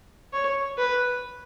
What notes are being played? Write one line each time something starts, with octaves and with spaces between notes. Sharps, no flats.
C#5
B4